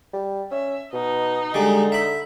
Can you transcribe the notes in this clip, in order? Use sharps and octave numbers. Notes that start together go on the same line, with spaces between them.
G3
C#4 E5
B2 D#4
D3 G3 G#3
E5 B5